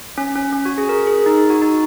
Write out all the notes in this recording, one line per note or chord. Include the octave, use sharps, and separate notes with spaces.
C#4
C#4
C#4
F#4
G#4
A#4
G#4
D#4
F#4
D#4